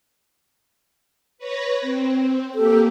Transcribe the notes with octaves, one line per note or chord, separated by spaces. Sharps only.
B4 C#5 A#6
C4
A#3 G4 A4